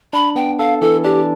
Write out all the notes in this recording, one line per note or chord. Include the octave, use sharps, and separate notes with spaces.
D4 B5
B3 G5
A4 F5
E3 A4
D4 G4